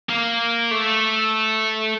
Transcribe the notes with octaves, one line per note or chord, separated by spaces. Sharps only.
A#3
A3